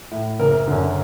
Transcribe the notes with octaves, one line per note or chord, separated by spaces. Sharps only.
A2
F#1 A#4
F#2 D3